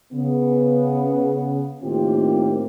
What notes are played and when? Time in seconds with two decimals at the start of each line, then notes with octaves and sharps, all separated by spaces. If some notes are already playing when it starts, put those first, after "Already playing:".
0.13 C#3 B3
1.83 A2 D#3 A#3 C4 F4 G4